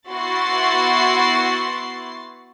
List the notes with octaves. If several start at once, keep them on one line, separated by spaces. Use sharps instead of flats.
B3 E4 F#4 C6 A6 C7